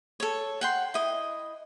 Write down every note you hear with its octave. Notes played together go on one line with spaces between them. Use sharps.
A4 C#5
F#5 G5 C6
E4 D#5